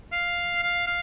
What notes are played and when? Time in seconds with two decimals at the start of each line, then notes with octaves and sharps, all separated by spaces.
0.12 F5
0.62 F5
0.87 F5